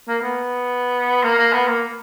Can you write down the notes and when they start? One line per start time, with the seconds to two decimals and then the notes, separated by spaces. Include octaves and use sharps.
0.08 A#3
0.22 B3
1.23 A#3
1.38 A#3
1.53 B3
1.68 A#3